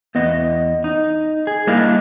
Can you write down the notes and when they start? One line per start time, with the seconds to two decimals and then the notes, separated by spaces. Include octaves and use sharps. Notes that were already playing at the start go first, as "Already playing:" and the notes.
0.15 E2 B3 D#5
0.84 D#4
1.47 G#4
1.67 G3 A#3 D4 E4 D#5 F5